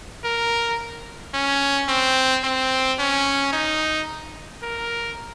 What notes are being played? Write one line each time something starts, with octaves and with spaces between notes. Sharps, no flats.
A#4
C#4
C4
C4
C#4
D#4
A#4